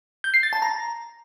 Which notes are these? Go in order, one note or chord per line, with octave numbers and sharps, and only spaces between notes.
G6
C7
A6
A5
A#5